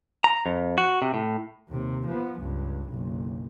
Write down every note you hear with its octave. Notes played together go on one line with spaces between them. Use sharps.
A#5
F2
F#4
C3
A2
D#2 C3
F3 B3
C#2 G2
F#1 B1